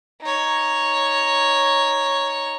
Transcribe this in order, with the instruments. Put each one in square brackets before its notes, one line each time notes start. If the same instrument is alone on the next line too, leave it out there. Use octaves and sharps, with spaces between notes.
[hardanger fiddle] D#4 C#5